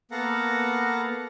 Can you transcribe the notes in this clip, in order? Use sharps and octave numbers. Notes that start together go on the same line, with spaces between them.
A#3 B3 A4 F5 F#5 A#5